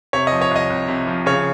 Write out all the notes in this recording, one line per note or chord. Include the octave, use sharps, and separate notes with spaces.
C3 C#5
D#5
F3
C#5
C2 D#5
C2
C3
F3
C#3 C#5